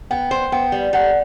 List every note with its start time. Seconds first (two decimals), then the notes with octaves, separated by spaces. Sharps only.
0.11 B3 G5
0.31 C5
0.52 B3 G5
0.72 G3
0.93 G3 F#5